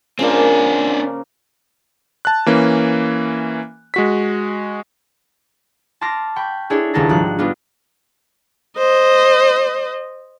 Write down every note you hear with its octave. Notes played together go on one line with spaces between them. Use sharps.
C#3 F3 A#3 C4 D4
A5 F#6
E3 A#3 C#4
G#3 F#4 B6
A5 C6 D6 F6 A#6
G5 B5 C#6
D4 E4 G#4 A4 C#5
D#1 C#2 E4 A4 A5 A#6
G#1 F3 G3 D4 F#6
G3 B3 D4 D#4 F4
C5 D#5